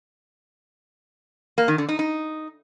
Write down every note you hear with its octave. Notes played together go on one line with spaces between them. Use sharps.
A#3
D#3
D3
D#4
D#4